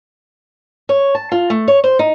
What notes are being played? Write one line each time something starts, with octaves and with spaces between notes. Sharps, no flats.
C#5
A5
F4
A3
C#5
C5
D#4